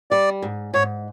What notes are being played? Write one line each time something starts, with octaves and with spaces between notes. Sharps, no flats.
G3 D5
G#2
G#2 C#5